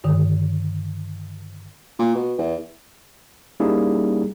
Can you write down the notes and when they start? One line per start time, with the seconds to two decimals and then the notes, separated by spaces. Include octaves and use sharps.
0.04 G2 D3 D#3
1.99 A#2
2.15 B2
2.38 E2
3.60 G3 A#3 C#4 D#4 E4 G#4